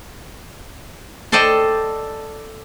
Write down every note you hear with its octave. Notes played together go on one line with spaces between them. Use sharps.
A4 C5 D5 D#5 G5